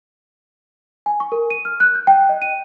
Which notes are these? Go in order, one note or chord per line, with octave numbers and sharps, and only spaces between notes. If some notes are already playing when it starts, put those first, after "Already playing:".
G#5
C#6
A#4
D#7
F6
F#6
G6
G5
D#5
D#7